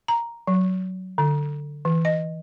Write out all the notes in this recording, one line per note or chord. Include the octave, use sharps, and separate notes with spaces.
A#5
F#3
D3
E3
D#5